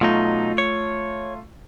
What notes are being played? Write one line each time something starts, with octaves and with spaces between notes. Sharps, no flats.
B2 F#3 A3 D#4 F4
C#5